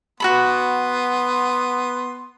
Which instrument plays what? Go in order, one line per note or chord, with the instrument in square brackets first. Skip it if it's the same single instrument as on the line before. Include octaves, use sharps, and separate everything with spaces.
[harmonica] B3 C6 [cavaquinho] F#4 A4 B5